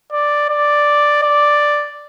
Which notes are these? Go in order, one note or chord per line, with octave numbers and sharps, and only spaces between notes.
D5
D5
D5